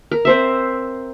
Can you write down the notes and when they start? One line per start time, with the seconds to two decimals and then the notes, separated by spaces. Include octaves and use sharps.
0.11 A#4
0.25 C4 C5 E5